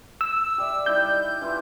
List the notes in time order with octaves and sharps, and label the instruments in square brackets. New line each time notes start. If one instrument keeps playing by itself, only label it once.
[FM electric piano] E6
[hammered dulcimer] G4 D5 E5
[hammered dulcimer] G3 D#4 E4 [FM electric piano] G6
[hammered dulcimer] E3 E4 F4